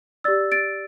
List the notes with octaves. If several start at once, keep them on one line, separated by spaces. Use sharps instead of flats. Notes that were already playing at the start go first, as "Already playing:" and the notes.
G4 D5 E6 A6
A6 D7